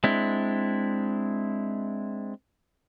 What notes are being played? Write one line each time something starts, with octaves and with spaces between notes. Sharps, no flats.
G#3 C4 D4 E4